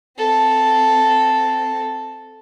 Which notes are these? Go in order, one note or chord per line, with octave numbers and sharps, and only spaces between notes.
C4 A4